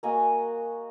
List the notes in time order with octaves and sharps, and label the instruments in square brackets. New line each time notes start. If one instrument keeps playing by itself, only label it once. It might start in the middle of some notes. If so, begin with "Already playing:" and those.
[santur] A#3 F#4 D#5 G#5